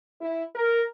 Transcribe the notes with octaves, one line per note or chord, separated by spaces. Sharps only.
E4
A#4